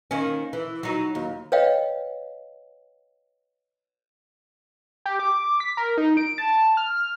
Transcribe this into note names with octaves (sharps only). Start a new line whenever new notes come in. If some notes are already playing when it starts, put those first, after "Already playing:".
D#3 A#3 C#4
E3
F#3 D#4
D#2
B4 C#5 D#5 F5 G5
G4
D6
B6
A#4
D#4
D7
A5
F6